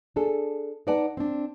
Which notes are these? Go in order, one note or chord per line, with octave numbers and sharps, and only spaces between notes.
D4 G#4 A4
D#4 B4 D5 F#5 A5
C4 D4